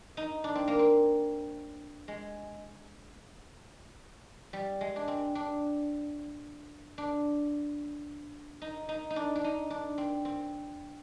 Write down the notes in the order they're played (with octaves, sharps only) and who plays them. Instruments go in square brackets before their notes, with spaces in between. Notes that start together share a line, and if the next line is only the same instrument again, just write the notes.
[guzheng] D#4
D4
C4
A#3
C4
G#3
G3
G#3
D4
C4
D4
D4
D#4
D#4
D#4
D4
D4
D#4
D4
C4
C4